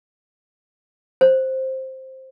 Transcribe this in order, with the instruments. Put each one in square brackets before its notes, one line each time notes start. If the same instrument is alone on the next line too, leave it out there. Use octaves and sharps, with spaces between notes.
[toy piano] C5